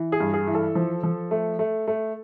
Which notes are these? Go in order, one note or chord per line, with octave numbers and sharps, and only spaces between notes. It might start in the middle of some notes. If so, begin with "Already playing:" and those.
Already playing: E3
G#4
G2
G#4
E3
A4
F3
F3
A3
A3
A3